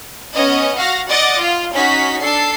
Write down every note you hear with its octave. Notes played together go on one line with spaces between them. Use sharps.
B3 C#4 D#5
F#4 F5 A#6
D5 D#5 F#5 D6 A6
F4
C#4 D#4 F#4 B6
D4 A4 C7